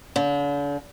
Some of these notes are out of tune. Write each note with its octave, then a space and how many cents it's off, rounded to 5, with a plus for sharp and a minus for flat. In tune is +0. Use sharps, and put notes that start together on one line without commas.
D3 -40